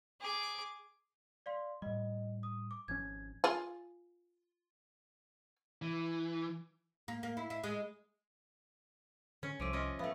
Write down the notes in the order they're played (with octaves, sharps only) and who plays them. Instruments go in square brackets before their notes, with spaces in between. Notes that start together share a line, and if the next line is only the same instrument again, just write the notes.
[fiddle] G#4 D6
[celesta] D5 F5 C6
[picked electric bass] A2 G3 [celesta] D#5
[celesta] D#6
D6
[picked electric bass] G#1 F3 C#4 [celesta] G#6
[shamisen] F4 G#4
[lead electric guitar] E3
[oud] A#3
A#3
E4
E4
G#3
[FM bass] D3 [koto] C#4
[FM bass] C2 [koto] F3 A3 [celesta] D6 D7 D#7
[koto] C#4 F4 D#5
[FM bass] F3 [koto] A3 B3 [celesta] E5 F5